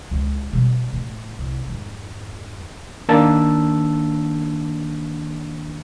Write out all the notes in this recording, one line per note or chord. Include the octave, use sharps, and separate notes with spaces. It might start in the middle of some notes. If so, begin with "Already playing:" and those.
C#2
B2 G3
A2
C2
F2 G#2
D#3 A#3 D4 A5 E6